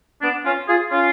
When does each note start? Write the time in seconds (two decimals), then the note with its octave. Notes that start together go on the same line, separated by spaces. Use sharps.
0.22 B3 D4
0.45 C#4 F4
0.68 F4 G#4
0.90 C#4 F4